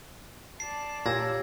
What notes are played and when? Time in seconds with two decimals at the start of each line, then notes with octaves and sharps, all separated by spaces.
0.60 D5 A5 C7
1.06 A#2 G4 C#5 E6 G#6 A#6